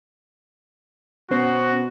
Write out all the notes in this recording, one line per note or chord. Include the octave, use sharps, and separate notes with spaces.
B2 B3 C#4 F#4 C5